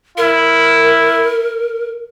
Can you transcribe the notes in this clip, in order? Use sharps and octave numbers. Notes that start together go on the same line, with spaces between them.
E4 A#4